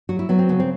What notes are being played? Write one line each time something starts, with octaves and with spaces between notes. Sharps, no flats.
F#3 F#4
E4
F#3 B3
C4
C#3 B3
C4